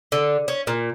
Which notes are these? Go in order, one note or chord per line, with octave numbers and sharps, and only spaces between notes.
D3
C#4
A#2